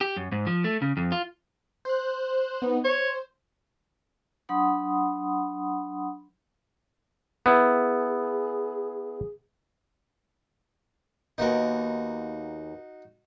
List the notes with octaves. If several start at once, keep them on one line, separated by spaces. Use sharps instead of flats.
G4
F#2
G#2
F3
A3
C#3
F2
F4
C5 F#6
B3 D#4
C5 C#5
F#3 D4 F#5 B5 C6 D#6
B3 E4 G#4
D#2 A#3 B3 D#4 F#4